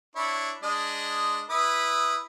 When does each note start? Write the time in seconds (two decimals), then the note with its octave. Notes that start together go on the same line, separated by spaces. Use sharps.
0.16 D4 E4 C#5
0.63 G#3 D4 D#5
1.50 E4 B4 D#6